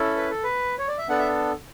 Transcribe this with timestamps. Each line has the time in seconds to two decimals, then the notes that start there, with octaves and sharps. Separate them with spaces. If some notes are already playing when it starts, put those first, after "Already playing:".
Already playing: C#4 E4 A4
0.16 B4
0.30 A4
0.44 B4
0.79 C#5
0.88 D5
0.98 E5
1.09 B3 D4 A4 F#5
1.19 E5